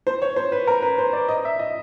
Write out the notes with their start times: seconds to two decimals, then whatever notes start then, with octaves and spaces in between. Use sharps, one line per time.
0.07 C5
0.22 C#5
0.36 C5
0.52 B4
0.67 A#4
0.82 B4
0.98 C5
1.13 D5
1.28 D#5
1.45 E5
1.59 D#5